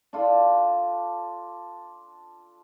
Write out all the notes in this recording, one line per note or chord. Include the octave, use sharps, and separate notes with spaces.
D4 F4 A4